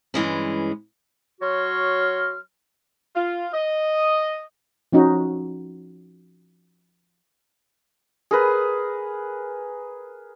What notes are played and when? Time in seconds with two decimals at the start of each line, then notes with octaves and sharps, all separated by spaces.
0.14 G2 E3 G#3 C#4
1.41 F#3 F#4 C#5 C6 F6
3.16 F4
3.53 D#5
4.93 F3 C#4 D#4 F#4
8.31 G#4 A#4 B4